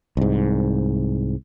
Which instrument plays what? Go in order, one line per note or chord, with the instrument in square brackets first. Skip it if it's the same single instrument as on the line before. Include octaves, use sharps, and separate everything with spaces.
[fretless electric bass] C2 G#2